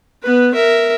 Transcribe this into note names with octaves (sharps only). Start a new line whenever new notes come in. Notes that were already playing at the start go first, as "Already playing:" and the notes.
B3 B4
A#4 E5